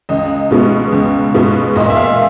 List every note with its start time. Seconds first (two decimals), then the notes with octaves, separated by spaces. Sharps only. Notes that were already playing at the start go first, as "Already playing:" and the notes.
0.09 C#2 D#5
0.51 B2 G#3 B3
0.92 C#2
1.34 B2 G#3 B3
1.76 A#2 D#5
1.90 E5
1.97 F5